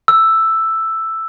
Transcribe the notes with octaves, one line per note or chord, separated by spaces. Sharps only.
E6